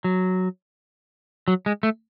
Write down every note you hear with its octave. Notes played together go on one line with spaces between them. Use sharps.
F#3
F#3
G#3
A3